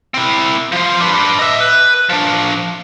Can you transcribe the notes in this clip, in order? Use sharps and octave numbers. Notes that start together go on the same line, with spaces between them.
C4 E4
F3 C5
D4 B4
D#5 E5
B4
F3 D4